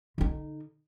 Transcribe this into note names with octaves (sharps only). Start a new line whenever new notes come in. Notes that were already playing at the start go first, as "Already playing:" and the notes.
D3 D#4